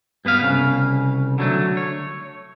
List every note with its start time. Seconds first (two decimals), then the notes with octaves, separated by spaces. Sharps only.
0.25 G2 B3 B4 F5
0.42 C2 C#3
1.38 D3 F#3 A3
1.77 C#5